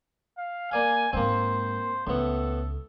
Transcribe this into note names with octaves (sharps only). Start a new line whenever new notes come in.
F5
A#3 D5 F5 G#5
G#2 G#3 A#3 C4 C5
C#2 A2 B3 A4